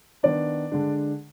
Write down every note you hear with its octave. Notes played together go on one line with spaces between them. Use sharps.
D#3 B3 D4 D5
D3 G#3 D4